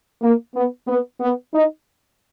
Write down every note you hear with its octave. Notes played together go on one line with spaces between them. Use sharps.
A#3
B3
B3
B3
D#4